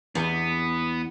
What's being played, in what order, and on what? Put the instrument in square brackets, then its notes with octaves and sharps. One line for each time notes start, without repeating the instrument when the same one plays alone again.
[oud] E2 [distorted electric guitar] B3